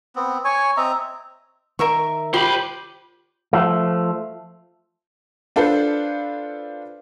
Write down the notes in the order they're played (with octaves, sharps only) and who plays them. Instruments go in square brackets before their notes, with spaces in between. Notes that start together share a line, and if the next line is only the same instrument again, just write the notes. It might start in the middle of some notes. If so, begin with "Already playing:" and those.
[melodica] B3 C4
C#5 G#5 C#6
C4 D#5 E5 A#5
[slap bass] D#3 [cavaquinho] A#4 E5 C#6
[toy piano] F4 [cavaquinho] G4 [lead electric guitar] C5 B5
[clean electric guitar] F3 A3
[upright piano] D4 F4 A4 B4 C5